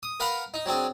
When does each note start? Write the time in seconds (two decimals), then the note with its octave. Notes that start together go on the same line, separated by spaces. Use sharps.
0.03 D#6
0.20 A#4 B4 F5 F#5 B5
0.54 D#4
0.66 F#3 C4 D4 G#4